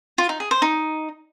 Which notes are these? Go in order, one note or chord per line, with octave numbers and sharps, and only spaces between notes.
F4
D#4
G#4
C5
D#4